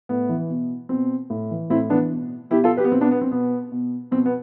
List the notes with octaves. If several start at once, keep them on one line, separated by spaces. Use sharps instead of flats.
A2 B3
E3
B2
B2 C4
A2
E3
A2 C4 E4
E3 B3 D4
B2
B2 E4 G4
F4 A4
G4 B4
B3
B2 C4
B3 D4
B3
C4
B2 B3
B2
B2 C4
B3